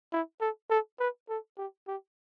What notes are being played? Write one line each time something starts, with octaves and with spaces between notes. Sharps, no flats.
E4
A4
A4
B4
A4
G4
G4